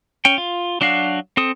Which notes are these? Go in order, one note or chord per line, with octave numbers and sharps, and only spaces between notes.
C#4 G5
F4
F#3 D4 F#4 F5
C4 A4 D#6